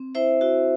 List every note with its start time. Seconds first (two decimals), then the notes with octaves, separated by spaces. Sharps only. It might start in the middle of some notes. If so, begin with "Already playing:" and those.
Already playing: C4
0.15 E4 C5 E5
0.41 E4 F#4